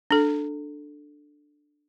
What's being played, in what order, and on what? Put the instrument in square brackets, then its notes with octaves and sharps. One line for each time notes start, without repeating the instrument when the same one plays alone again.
[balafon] D4 A4